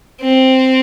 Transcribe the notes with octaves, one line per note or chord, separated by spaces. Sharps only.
C4